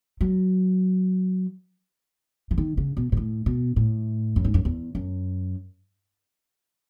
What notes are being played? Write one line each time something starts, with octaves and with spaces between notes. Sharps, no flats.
F#3
E3
D#3
C#3
B2
B2
A2
B2
A2
F#2
G#2
F#2
E2
F#2